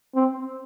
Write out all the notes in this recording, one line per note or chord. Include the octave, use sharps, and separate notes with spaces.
C4